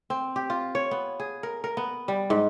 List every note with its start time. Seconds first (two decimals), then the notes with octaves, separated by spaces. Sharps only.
0.10 C4
0.36 G4
0.50 F4
0.75 C#5
0.91 B3
1.20 G#4
1.43 A#4
1.64 A#4
1.77 B3
2.08 G3
2.30 G#2